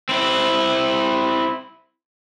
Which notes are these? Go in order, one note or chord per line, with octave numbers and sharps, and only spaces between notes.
C4 E4